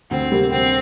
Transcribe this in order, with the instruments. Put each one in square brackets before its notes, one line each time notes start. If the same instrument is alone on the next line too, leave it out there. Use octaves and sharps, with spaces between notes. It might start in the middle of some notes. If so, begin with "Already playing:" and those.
[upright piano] D2 [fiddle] C4
[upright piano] C3 G3 A#3
[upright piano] D2 [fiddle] C4